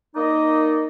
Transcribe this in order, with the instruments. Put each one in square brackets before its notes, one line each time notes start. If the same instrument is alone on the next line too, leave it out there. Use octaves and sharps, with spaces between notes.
[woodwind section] A#3 D#4 D5 D#5